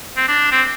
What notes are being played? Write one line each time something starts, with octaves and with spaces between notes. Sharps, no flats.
C4
D4
C4